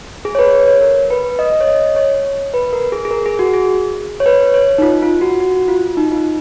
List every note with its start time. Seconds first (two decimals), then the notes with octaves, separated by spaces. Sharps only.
0.25 G#4
0.35 C#5
0.39 B4
0.53 C#5
0.68 C#5
0.81 A#4
1.10 B4
1.39 D#5
1.61 C#5
1.68 D#5
1.96 C#5
2.54 B4
2.73 A#4
2.92 G#4
3.05 G#4
3.11 A#4
3.26 G#4
3.39 F#4
3.53 G#4
4.20 C#5
4.26 B4
4.54 C#5
4.78 D#4
4.82 F4
5.02 F4
5.21 F#4
5.40 F#4
5.68 F4
5.97 D#4
6.12 F4
6.16 D#4